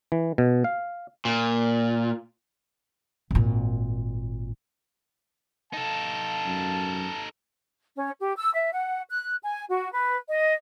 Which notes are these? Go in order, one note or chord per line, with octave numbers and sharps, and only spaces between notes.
E3
B2
F5
A#2
G#1 A#2
D#4 A4 F5 A5
F#2
C#4
G4
E6
E5
F#5
F#6
G#5
F#4
B4
D#5